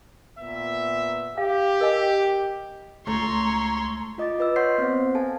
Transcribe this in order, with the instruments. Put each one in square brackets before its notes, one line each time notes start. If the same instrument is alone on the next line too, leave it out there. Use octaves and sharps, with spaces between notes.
[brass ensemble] A#2 B3 E5
[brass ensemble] G4 [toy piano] F5
[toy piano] A#4 D#5 G#5
[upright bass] C#2 [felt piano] A3 [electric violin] C#5 C6 [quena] A#5
[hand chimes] F4 D#5 D6 A6
F4 B4 D#5 E6
C#5 F#5 C6 G6 B6 C7
B3 C4 C5
A4 F5 G#5 A5